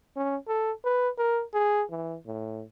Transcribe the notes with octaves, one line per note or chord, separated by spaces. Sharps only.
C#4
A4
B4
A#4
G#4
E3
A2